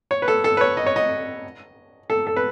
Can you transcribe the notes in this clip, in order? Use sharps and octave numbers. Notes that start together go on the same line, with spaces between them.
C#5
B4
A4
A4
B4
C#5
D#5
C#5
D#5
A4
A4
B4